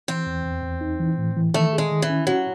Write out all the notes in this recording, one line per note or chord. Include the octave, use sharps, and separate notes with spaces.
E3 C4
E2
E2
E2
D#4
E3
A2
E3
D#3 A3
G#4
G#3
D#3
E3
C#4
F#3 F#4